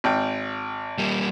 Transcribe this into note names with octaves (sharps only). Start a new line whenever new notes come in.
G#1 G5
G3 A#3